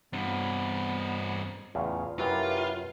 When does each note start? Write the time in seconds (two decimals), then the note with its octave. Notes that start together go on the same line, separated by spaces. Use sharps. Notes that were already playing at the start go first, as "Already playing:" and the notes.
0.13 G2 B3 C4 D4 F5
1.75 E2 A2 C#3 F4
2.19 F#2 C3 F#3 E4 F4 G4 A#4 B4